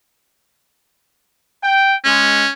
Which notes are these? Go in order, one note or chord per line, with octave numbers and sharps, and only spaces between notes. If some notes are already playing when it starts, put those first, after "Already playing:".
G5
G#3 C#4